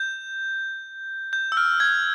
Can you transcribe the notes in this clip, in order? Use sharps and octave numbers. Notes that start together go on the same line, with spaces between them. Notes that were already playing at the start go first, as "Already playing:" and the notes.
Already playing: G6
G6
E6
F6
G#6